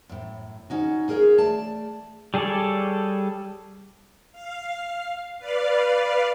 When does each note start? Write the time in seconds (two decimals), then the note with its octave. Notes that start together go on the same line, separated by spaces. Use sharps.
0.09 F#2 A2
0.70 C#4 D#4 F#4
1.08 D#4 G#4 A#4 B4 C#5 F5
1.38 A3 D5 A5
2.34 G3 G#4 A4 C#5 D5
4.32 F5
5.39 B4 D5 F5